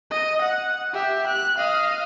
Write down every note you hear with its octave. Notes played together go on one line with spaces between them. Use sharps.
D#5
F#5
G4 E5
F#6
D#5 F5